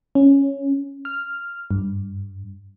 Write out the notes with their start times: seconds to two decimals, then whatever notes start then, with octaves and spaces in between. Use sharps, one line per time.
0.15 C#4
1.05 F6
1.71 G2